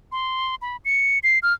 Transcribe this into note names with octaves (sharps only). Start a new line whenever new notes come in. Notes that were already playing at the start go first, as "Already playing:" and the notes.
C6
B5
C#7
C7
F6